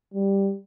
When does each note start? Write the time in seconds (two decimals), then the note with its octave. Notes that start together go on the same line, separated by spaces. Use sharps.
0.14 G3